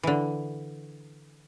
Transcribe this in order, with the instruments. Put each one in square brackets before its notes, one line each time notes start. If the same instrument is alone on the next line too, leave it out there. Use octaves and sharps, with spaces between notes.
[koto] D3 E3